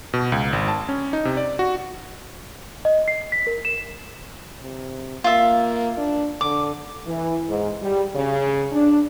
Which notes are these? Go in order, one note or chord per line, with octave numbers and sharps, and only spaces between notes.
B2
C#2
G#1
A5
C#4
D#4
C3
D5
F#4
D#5
C7
B6
A#4
E7
C3
A#3 F4 E5
D4
D3 D6
E3
G#2
G3
C#3
D4